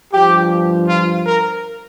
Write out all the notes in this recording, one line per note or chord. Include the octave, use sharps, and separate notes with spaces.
G2 F3 G4
F4
A#4